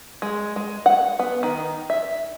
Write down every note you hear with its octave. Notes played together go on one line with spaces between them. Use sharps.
G#3
G#3
F#5
B3
D#3
E5